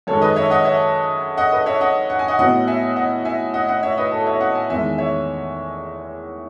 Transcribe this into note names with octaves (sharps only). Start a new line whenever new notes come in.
F#2 D#3 G#3 A4 C#5
B4 D#5
C#5 E5
D#5 F#5
C#5 E5
D#5 F#5
B4 D#5
C#5 E5
D#5 F#5
F#5
G#5
D#5 F#5
A2 F#3 B3 D#5 F#5
E5 G#5
D#5 F#5
E5 G#5
D#5 F#5
D#5 F#5
C#5 E5
B4 D#5
A4
C#5 E5
D#5 F#5
E5 G#5
E2 D#3 G#3 E5 G#5
C#5 E5